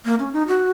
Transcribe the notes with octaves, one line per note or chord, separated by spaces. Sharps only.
A#3
C#4
D#4
F#4